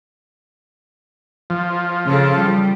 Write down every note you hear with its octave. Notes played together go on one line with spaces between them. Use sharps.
F3
C#3 A4
G3